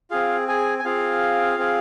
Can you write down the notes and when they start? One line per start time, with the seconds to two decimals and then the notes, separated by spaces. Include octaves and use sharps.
0.11 C4 F4 G#4 F5
0.48 G#4 G#5
0.79 G#5
0.84 C4 F4 G#4 F5
1.58 C4 G#4